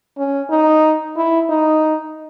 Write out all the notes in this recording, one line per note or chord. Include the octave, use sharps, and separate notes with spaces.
C#4
D#4
E4
D#4